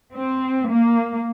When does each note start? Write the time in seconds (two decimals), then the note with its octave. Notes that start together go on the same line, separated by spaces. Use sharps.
0.14 C4
0.69 A#3